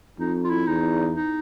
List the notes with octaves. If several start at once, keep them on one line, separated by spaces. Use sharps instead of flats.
F2 D#4
F4
E4
E2 D#4
D#4